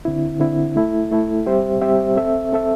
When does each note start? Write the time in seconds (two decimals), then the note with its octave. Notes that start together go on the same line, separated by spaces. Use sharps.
0.05 D3 C4 E4
0.40 D3 C4 E4
0.76 A3 E4 A4
1.11 A3 E4 A4
1.46 G3 C4 G4 C5 E5
1.82 G3 C4 G4 C5 E5
2.17 C4 A4 E5
2.53 C4 A4 E5